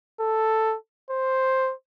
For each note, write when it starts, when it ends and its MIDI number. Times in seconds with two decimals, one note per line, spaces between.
0.20 0.76 69
1.11 1.73 72